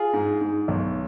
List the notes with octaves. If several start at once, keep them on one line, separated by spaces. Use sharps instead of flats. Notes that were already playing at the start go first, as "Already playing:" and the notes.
Already playing: F4 G#4
G#2
G#2
B1